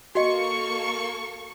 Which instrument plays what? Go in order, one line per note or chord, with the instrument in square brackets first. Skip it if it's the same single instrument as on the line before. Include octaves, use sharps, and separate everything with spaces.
[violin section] A#3 A4 C#6 [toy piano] F#4 D#5